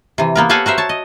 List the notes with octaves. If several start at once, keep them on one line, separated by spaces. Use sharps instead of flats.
C3 E3
A#3 B3 A#4
G4 A4 C#5 F5 F#5 G#5
F#4 A#4 C5 E5
C#5 A5
D#5